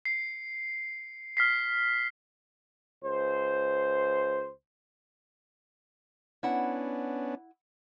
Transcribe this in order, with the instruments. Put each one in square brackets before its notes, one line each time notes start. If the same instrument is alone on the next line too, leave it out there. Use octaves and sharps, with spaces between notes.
[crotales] C7 C#7
F6 B6 C7
[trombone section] C#2 C5
[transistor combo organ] B3 C#4 D4 [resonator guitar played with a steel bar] E4 F#5